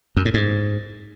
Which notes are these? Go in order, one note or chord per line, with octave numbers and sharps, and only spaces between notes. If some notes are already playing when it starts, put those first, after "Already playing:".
F#2
A2
G#2